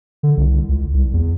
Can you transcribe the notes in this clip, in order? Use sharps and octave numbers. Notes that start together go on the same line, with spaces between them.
D3
C2
C#2
C2
E2